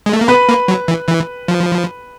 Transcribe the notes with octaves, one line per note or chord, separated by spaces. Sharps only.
G#3
A3
A#3
B3 B4 B5
A#3
F#3
E3
E3
F3